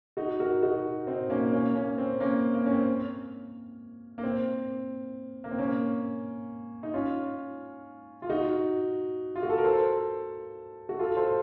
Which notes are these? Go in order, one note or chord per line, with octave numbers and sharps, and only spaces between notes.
D#4 F#4
F#4 A#4
D#4 F#4
C4 D#4
A#3 C#4
A#3 C#4
A#3 C#4
C4
A#3 C#4
A#3
C#4
C4
A#3
C4
A#3
C4
A#3 C#4
D#4
C#4 F4
F4
D#4 F#4
F4
F#4
A4
A#4
A4 C5
F#4
F4 A4
A4 C5